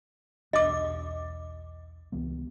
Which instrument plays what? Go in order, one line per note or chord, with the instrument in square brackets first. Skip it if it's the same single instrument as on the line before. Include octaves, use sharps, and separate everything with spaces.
[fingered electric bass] B1 E2 D4 [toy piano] D#5 D6
[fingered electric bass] C#2 E3 B3